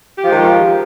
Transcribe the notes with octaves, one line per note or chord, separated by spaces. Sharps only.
D#3 F3 G#3 F4 G4